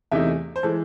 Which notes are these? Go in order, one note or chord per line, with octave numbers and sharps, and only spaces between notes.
E2 C3 E3 A3 D#4 E5
C5
E3 G#3 A4